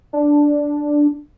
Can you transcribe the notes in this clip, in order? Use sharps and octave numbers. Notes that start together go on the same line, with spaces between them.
D4